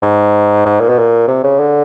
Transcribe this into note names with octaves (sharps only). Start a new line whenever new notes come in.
G#2
G#2
A#2
B2
A#2
C3
C#3
D3